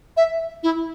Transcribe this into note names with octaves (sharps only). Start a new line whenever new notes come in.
E5
E4